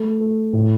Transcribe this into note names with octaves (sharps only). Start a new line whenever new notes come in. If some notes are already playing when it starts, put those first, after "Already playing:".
Already playing: A3
A3
A2